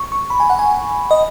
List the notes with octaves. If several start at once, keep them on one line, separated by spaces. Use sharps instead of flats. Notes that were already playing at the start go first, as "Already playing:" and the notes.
Already playing: C#6
C#6
B5
G#5
F#5
G#5
D#5